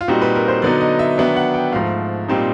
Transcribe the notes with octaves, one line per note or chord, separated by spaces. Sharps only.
F4
A#2 G3 C4 D#4 F#4
B4
A#4
C5
D3 F#3 B3 D#4 D5
D#5
E5
D#3 F#3 B3 D4 E5
F#5
G5
G#2 F3 A3 F5
A#2 G3 C4 D#4